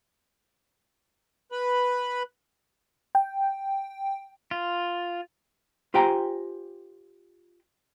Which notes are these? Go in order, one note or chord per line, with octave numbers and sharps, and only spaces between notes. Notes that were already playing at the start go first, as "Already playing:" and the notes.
B4 B5
G5
F4
F4 G4 C5 G5 G#5 A#5